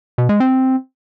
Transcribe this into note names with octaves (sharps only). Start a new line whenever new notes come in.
B2
G#3
C4